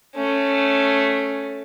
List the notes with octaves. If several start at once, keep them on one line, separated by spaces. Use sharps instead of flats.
A3 C#4